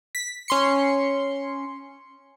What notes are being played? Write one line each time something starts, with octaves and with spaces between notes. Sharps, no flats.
B6
C#4 C6 C#7